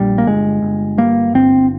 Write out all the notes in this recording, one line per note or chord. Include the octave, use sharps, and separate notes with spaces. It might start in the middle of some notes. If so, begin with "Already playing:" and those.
Already playing: A#1 G3
A#3
G1 G#3
G1
G2 A#3
G1 C4